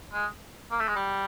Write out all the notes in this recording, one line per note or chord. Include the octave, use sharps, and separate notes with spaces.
G#3
A#3
A3
G#3
G3